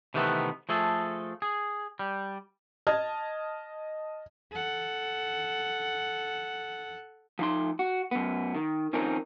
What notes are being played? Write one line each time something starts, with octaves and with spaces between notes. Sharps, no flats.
C3 D#3 E3 A3 B3
F3 A3 G#4 A4
G#4
G3
D#5 A5 F6 G#6
A4 F#5
F3 D#4 C6
F#4
F#2 B3
D#3
D#3 F3 C4 C#4 D#4 A#4